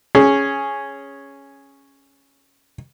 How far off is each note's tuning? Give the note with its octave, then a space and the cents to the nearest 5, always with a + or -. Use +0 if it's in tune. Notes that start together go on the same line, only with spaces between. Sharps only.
C#4 +0 G#4 +0